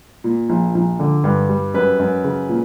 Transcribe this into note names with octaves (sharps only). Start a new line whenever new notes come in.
A#2
A#1
A#1
D3
G2
G3
F#2 B4
F#2
C#3
A#2